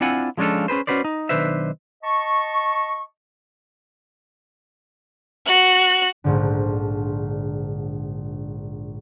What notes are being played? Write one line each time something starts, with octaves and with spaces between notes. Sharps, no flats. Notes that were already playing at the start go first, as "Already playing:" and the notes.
C4 D4 E4 F4 F#5 G#5
F3 G#3 C#4 D4 F4 A4
C#4 G#4 B4 C5
C#4 D4 F#4 B4 C5 D5
D#4
B1 D#3 D4 B4 C5 E5
D#5 A5 C#6
F#4 F#6
A#1 G#2 D3